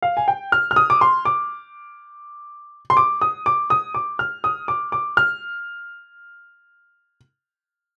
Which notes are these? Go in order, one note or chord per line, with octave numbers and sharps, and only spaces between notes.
F5
G#5
G5
F6
F6
D#6
D6
C6
D6
C6
D6
D#6
D6
D#6
D6
F6
D#6
D6
D6
F6